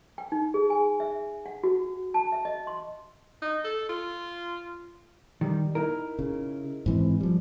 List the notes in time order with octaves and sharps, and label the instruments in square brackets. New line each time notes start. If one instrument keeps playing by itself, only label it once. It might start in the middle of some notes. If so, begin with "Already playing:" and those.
[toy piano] G5
D#4
G#4
G#5
E5
F#5
F#4
A5
E5
D#5
C6
[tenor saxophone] D#4
A4
F4
[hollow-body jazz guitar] D#3 G3
D#4 E4 A#4
[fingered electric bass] C#3
G#2 E3 C4
F3 G3